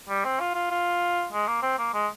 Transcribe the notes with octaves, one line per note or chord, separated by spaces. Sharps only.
G3
C4
F4
F4
F4
G#3
A#3
C4
A#3
G#3